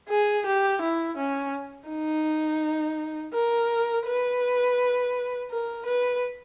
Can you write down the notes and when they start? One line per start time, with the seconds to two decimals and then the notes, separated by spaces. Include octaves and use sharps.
0.09 G#4
0.46 G4
0.81 E4
1.17 C#4
1.89 D#4
3.33 A#4
4.06 B4
5.50 A#4
5.86 B4